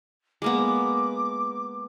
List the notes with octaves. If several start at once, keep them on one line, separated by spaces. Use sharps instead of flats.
G#3 A#3 B3 D6